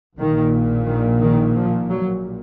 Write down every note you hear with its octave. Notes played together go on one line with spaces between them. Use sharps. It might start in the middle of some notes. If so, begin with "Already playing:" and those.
A#1 A#2 D#3
D#3
D#3
F3
F#3